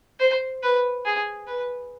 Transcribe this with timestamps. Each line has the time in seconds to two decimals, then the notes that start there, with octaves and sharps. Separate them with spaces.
0.20 C5
0.63 B4
1.05 G#4
1.47 B4